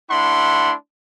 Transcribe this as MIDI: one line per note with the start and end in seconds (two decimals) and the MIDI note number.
0.11 0.74 57
0.11 0.74 62
0.11 0.74 64
0.11 0.74 78
0.11 0.74 83
0.11 0.74 84